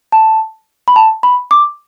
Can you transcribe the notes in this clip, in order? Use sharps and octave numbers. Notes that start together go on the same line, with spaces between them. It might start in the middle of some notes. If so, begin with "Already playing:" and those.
A5
B5
A5
B5
D6